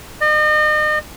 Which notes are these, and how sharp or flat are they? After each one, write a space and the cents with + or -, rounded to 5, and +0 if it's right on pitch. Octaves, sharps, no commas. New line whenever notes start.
D#5 -40